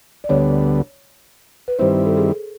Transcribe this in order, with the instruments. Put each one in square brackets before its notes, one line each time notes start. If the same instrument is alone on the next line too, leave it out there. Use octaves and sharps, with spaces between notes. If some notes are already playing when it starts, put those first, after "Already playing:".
[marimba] D5
[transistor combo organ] D2 D3 G3 B3 [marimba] C#5
[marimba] B4
[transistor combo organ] G2 D#3 G3 C4 E4 [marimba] C5
[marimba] A4
G#4